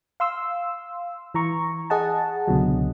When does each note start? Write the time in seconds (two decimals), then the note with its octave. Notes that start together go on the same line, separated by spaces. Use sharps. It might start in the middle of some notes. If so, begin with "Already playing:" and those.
0.20 F5 C6 E6
1.34 E3 A#5 C#6
1.90 G#4 D#5 F#5 A5
2.47 C#2 B2 D3 F#3